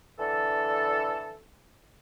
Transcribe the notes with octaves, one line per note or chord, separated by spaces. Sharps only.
D3 E3 A4